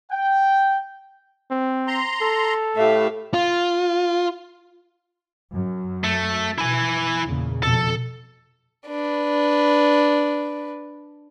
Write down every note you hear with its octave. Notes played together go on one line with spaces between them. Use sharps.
G5
C4
A#5 C6
A4
A2 A3 G4 E5 F5
F4
F#2
A3
B2 E4 G#5
E2 A#2 C#3
F2 B2 A4
D4 B4